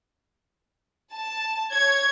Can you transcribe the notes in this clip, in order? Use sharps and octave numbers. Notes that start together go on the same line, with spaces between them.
A5
C#5 G#6